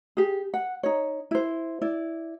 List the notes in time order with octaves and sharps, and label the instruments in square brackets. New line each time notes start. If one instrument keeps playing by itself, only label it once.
[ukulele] G4 G#4
F#5
D#4 C#5
E4 C5
E4 D5